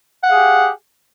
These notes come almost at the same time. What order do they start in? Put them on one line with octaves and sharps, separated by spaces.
F#5 F5 G#4 G4